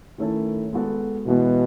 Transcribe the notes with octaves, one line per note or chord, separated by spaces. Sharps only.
D#3 A3 C#4 E4 A4
G#3 B3 F#4 A4
B2 E3 G#3 B3